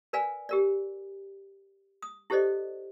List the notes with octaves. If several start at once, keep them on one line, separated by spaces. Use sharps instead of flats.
A#4 B4 D5 F5 G#5
G4 A#4 D5
D#6
E4 G4 A4 C5 D5 D#5